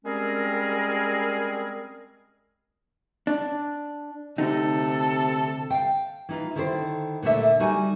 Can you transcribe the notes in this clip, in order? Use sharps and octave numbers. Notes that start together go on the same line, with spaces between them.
G3 G#3 C4 C#4 G#4 A#4
D4
D2 C3 D#4 A4
F5 G5
E3 D#4 F4
D3 D#3 E4 A4 A#4 C5
A#2 D3 A3 E5
G3 D#4 F#4 G#5